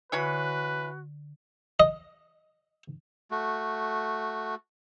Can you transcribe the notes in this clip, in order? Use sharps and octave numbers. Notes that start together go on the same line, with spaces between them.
D3 E3 F#4 B4 C#5 B5
D#5
A3 F#4